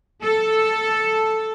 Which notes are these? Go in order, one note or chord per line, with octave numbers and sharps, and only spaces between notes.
A4